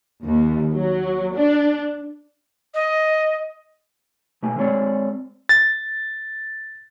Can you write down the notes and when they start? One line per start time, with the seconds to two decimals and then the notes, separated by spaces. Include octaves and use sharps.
0.23 D#2
0.73 F#3
1.34 D4
2.74 D#5
4.43 B2 A3 G#5
4.56 G#3 C4 C#5 D5
5.49 A6